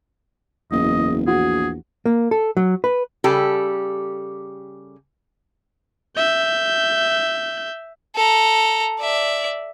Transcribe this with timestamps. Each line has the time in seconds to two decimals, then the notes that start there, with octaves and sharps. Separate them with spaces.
0.72 F#1 E2 D#5
1.27 A#1 F#4 G#4
2.06 A#3
2.31 A4
2.57 F#3
2.84 B4
3.24 C#3 G3 G4 A4
6.17 E5 G6
8.15 A4 A#5
9.01 D5 E5